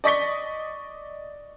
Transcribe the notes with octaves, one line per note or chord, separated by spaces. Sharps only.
D5 D#5 C#6 B6 G7